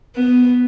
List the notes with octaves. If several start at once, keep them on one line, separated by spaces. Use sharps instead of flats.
B3